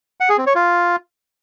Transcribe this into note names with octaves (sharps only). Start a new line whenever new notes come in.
F#5
G#4
C4
C#5
F4